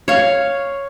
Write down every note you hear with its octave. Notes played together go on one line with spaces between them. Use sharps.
C#5 F5